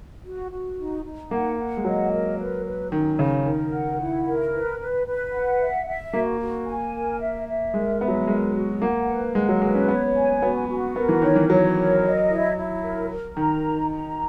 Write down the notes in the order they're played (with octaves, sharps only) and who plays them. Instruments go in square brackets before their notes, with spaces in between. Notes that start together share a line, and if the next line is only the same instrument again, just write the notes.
[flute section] F#4
F#4
D#4
D#4
[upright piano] A#3 [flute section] F#5
[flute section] F#5
[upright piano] G#3
[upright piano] F#3 [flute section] D#5
[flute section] A#4
B4
B4
[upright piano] D#3 [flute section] C#4
[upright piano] C#3 [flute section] C#4
[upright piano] D#3 [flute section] A#4
[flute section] F#5
E4
A#4
B4
B4
B4
F#5
E5
E5
[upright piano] A#3 [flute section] F#4
[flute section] F#4
G#5
A#4
E5
E5
[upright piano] G#3 [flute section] A#4
[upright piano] B3 [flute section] E5
[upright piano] F#3
G#3
[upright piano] G#3 [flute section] A#4
[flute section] F#4
[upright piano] A#3 [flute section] F#5
[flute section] B4
[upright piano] G#3 [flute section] F#5
[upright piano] F#3
[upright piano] G#3 [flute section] B4
[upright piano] C#4
[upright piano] B3 [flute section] C#5
[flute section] G#5
[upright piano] B3 [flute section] F#4
[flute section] F#4
[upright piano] B3 [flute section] A#4
[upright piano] E3
[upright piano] D#3 [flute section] C#5
[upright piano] E3
[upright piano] F#3 [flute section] C#5
[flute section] A#4
D#5
E4
E4
A#4
A#4
[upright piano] D#3 [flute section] A#5
[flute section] D#4
A#5